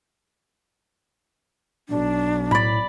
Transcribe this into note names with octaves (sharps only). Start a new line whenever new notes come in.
B1 D4
A2 D5 B5